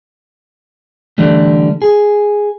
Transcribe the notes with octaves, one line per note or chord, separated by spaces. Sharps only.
D3 E3 G3 A3
G#4